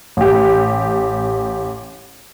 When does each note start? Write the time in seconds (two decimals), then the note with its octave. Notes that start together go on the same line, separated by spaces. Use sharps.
0.17 A1 G4